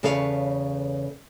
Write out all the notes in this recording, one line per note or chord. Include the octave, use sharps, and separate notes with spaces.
E2 C#3 A4 B4 C#5 F5